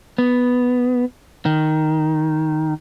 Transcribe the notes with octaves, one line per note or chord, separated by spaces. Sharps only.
B3
D#3